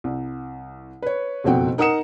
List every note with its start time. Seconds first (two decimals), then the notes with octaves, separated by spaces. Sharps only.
0.04 C2
1.02 B4 C#5
1.44 F#1 F2 B2 C4 F#4 G5
1.78 D#4 A#4 F#5 D#6 C#7 E7